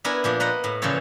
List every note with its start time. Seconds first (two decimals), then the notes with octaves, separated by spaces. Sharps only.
0.05 B3 D4 E4 A#4 G#5
0.24 A#2 F3 D4
0.40 A#3 B4 D#5 F#5
0.64 A2
0.82 A#2 C#3 E3 F3 A4 C#5